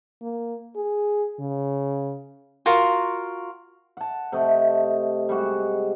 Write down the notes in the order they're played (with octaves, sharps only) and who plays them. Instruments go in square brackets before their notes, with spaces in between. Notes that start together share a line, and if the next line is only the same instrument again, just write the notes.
[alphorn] A#3
G#4
C#3
[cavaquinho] F4 F#4 A#4
[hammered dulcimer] F#5 A5
C3 A3 D#5
G3 G#3 F#4